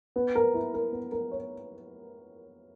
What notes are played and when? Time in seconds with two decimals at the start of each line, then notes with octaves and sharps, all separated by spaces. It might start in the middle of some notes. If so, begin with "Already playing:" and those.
0.16 B3
0.35 A#4
0.54 E4
0.74 A#4
0.92 B3
1.12 A#4
1.32 C#5